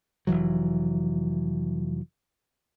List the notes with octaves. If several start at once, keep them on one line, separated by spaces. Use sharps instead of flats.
F1 D#2 E3 F#3